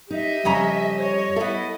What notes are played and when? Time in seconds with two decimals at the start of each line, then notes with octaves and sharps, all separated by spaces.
0.11 D#4 G4 D#5 E5
0.45 F2 C#3 G3 C#4 A#5
0.94 C#5 D#5
1.36 B3 E4 A4 D#5 E5